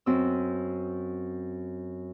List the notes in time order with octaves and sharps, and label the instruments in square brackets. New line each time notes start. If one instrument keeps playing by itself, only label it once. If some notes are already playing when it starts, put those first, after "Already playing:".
[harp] F#2 C4 E6